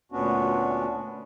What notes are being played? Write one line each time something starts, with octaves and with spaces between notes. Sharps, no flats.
D2 A#2 B3 C#4 D4 F#4